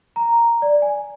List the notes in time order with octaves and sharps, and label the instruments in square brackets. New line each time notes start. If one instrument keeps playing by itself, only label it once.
[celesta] A#5
D5
G#5